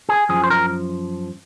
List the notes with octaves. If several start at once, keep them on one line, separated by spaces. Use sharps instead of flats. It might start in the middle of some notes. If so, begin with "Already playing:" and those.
G#4
F#2 F3 G#4
C5
A#4